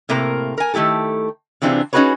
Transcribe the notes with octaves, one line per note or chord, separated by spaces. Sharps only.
A2 C3 A#3 A#4
A#4 G#5
D#3 A3 E4 G4 A4
C3 E3 C4 D4 F4 G#4
C#4 D#4 F#4 G#4 B4 C#5